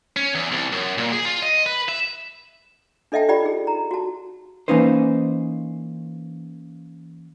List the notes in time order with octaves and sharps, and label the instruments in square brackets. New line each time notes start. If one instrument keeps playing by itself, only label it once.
[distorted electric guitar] C#4
E2
C2
F#2
A#2
G#4
F4
D#5
B4
E5
[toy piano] D4 A4 D#5 E5 G5 A5
F4 G4 D5 G5 B5
D#4 G#4
A#5
F#4 A5
[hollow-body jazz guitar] E3 A#3 C#4 D#4 B4 C5